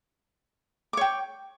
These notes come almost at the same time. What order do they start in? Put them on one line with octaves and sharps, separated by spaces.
D6 C#5 G5